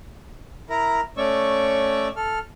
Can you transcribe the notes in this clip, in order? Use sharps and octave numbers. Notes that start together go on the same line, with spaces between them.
E4 A#4 A#5
A3 C#4 C#5 D5 C#6 E6
A4 F6